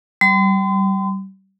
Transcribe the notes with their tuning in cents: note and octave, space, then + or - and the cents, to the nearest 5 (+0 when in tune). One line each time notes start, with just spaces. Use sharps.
G3 -25 C6 -45